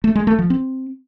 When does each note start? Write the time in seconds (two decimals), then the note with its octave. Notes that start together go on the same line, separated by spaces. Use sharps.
0.04 A3
0.15 G#3
0.27 A3
0.39 F3
0.50 C4